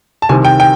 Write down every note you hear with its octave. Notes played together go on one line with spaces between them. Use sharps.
A5
C2 C3 D#3 G#5
G5
G5